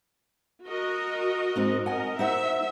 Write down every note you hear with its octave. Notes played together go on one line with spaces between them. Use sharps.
F#4 A#4 D#5
G#2 C4 D#4
A#4 D#5 F#5 G#5
D#4 C5 E5 F#5